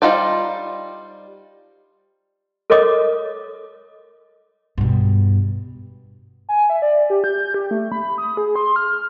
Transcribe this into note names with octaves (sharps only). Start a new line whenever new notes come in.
G3 D#4 F4 C5 D5
A4 A#4 C#5 D#5 D6 D#6
G2 B2
G#5
E5
D5
G4
G6
G4
A3
B5
D#6
G#4
C6
F6